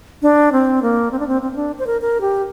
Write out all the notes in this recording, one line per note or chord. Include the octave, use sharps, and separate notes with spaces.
D4
C4
A#3
C4
D4
C4
C4
C4
D4
C5
A#4
A#4
G4